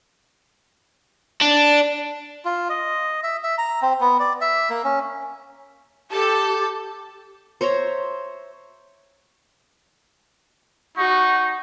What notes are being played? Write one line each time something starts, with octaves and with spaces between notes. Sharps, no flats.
D4
F4
D#5
E5
E5
A#5
C4
B3
D5
E5
A#3
C#4
G4 A4 A5
C5 C#5 E5 A#5
D#4 F#4 C#6